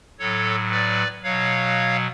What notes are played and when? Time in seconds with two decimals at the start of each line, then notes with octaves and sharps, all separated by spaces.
0.19 A2 F#3 A4 C#5
0.71 B4 D5
1.23 B2 F#3 C#5 F5